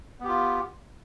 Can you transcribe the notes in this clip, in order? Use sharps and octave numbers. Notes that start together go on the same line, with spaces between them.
B3 F4 G4